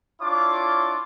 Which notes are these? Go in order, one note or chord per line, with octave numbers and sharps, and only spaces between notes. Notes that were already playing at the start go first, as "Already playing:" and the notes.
D4 E4 F4 C#5 D6